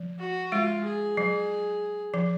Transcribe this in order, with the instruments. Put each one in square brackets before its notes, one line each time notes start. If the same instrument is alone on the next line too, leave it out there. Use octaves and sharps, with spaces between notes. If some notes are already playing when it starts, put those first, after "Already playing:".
Already playing: [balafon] F3
[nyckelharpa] F#4
[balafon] G#3 [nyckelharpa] F4
[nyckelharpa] G#4
[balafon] F#3
F3